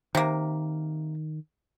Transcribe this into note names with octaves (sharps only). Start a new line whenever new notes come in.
C3 D#3 A#3